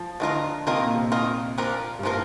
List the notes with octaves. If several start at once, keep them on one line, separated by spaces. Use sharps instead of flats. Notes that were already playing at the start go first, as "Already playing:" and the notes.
Already playing: F3
D3 D#3 A#3 F4 A#4 D#5
C3 D#3 A#3 F4 A#4 D#5
A#2
C3
D#3 A#3 F4 A#4 D#5
F3 A#3 D4 F4 A#4
G2
F3 A#3 D4 F4 A#4